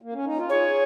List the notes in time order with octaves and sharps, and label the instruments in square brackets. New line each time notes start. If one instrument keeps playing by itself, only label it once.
[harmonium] A#3
C#4
D#4
F4
[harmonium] G#4 [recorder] C#5